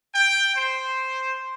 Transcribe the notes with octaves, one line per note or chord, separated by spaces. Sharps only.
G5
C5